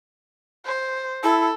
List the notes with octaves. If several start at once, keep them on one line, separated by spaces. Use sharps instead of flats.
C5
E4 A4